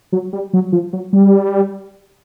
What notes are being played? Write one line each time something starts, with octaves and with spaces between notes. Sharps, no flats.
F#3
G3
F#3
F3
F#3
G3